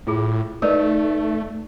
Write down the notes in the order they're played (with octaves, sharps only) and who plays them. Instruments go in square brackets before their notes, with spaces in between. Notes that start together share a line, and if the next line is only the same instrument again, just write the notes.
[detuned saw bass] A2 [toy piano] E4 F4 G#4
[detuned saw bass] A3 [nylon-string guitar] D#4 [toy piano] A#4 B4 D5